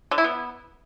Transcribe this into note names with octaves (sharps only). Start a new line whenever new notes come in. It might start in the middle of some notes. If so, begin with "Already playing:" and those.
D3
E4
B3